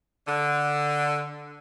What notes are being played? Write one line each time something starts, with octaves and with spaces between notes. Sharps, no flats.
D3